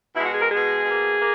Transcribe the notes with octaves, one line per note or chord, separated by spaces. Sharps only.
B2 G#3 E4
F#4
G#4
A#4
B2 G#3 G#4
B2 A#3
A#3